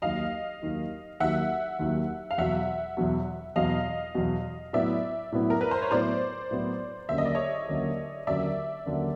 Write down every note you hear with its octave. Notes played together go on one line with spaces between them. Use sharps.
D#2 D#3 F#3 D#5 F5
D#2 D#3 F#3
D#2 D#3 F#3 E5 F#5
D#2 D#3 F#3
F5
E2 B2 F#3 E5 F#5
E2 B2 F#3
E2 B2 F#3 D#5 F5
E2 B2 F#3
A2 F#3 B3 E4 D5 E5
A2 F#3 B3 E4
A#4
B4
C5
C#5
A2 F#3 B3 E4 C5 D5
A2 F#3 B3 E4
D#2 D3 F#3 A#3 C#4 E5
D#5
D5
C#5 D#5
D#2 D3 F#3 A#3 C#4
D#2 D3 F#3 A#3 C#4 D5 E5
D#2 D3 F#3 A#3 C#4